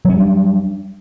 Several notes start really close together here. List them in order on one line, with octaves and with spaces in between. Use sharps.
F#3 C#4 G3 D4